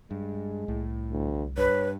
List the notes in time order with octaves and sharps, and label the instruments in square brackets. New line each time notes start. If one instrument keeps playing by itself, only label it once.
[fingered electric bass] G2 [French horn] G#3
[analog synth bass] C2 [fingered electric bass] A2
[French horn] D2
[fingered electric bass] G2 [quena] B4 [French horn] C#5